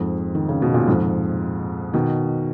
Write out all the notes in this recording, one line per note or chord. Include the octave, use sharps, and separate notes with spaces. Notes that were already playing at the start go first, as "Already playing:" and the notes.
Already playing: F2 G#2
D#3
C#3
B2
A#2
F2 G#2
B2 D#3